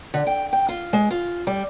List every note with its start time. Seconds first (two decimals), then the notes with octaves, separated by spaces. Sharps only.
0.14 D3
0.27 G5
0.53 G5
0.69 F4
0.93 G#3
1.11 F4
1.47 G3